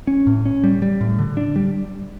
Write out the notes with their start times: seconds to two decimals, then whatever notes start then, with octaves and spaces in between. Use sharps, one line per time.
0.07 C#4
0.27 A2
0.45 C#4
0.64 G3
0.82 G3
1.01 A2
1.19 D3
1.37 D4
1.56 G3